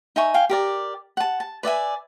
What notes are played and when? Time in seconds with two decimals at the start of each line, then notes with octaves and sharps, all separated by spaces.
0.16 D#4 E5 G#5 C#6
0.34 F5 G5 G#5
0.49 G4 A#4 D5
1.17 F#5 A5
1.40 A5
1.63 B4 D5 E5 G#5